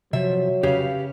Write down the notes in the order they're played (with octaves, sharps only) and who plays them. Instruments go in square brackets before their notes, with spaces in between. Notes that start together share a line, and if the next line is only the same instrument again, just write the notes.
[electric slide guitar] C3 F3 [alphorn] F#3 [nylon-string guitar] E5
[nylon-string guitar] C#3 [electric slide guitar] G4 B4 F5